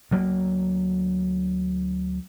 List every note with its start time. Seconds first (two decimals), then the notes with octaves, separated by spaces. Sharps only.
0.11 D2 F#3 A#3